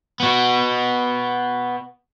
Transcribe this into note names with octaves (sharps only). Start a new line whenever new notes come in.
B3 F#4